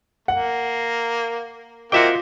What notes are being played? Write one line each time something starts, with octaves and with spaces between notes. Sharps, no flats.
A#3 F#5
A#3 C4 F4 F#4 D#5 E5 G5 D6